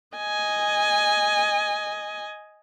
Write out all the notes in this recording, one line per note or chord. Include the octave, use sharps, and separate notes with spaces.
D#5 G#5